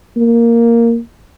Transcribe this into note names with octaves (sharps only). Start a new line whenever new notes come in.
A#3